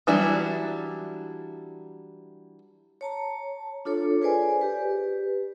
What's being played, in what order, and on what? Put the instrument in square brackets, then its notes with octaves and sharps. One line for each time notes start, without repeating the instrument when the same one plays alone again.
[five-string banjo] E3 F#3 G3 D4 E4
[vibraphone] C#5 A5 A#5
D4 F4 A4 C#5
G#4 B4 C5 D5 G#5
G4 B4